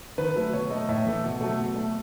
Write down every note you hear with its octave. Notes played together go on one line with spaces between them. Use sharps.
D#3 B4
F#3 A3
B2 C#5
A3 D#5
A2 E5
E3 A3
B2
F#3 A3
B2
A3